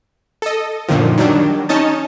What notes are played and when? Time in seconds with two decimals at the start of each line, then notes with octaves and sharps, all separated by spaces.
0.42 A4 D#5
0.88 F#2 A#2 D3 D#3 F3
1.18 D#3 F#3 G3 D4
1.69 C#4 D#4 C#5 D#5 A5